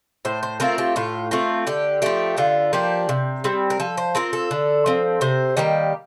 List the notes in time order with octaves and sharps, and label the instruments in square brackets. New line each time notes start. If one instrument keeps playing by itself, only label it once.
[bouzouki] A2 C5
C5
A3 C4 F4 A#4
G4
A2 F4
A3 C4 F4
D3 G4
F3 A3 G4
D3 F4
F3 A#3 D4 G4
C3
G3 C4
A#4
F3 A4
C5
C4 F4 A#4
A4
D3
F3 C4
C3 C5
D#3 G3 A#3 G4